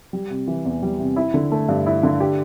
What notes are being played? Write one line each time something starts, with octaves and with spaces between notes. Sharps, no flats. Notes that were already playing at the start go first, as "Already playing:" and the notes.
G3
C3
E3
E2
G3
C3
E4
D3
A3
G2
E4
D3
G4